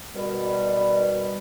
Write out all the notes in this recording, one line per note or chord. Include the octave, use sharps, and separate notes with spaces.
B2 D#3 G3